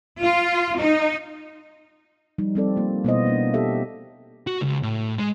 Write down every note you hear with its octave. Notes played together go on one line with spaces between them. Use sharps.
F4
D#4
F3 G3 D#4
G3 C4 A4 D5
A#3 F4
B2 A#3 B3 E4 C5 D#5
A#3 D4
G4 A4 E5
F#4
C#2
A2
G#3